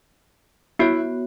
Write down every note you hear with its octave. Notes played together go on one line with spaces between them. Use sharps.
B3 E4 F#4 C#5